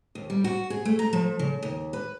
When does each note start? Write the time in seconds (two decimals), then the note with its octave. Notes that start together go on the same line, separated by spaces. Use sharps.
0.15 D#2
0.30 G3
0.44 F#4
0.70 G#4
0.85 A3
0.99 A#5
1.13 F3
1.39 C#3
1.63 D#2
1.93 B4